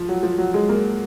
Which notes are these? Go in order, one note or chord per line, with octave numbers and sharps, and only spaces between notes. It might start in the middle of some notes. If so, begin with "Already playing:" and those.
Already playing: F3
F#3
F3
F#3
G#3
A#3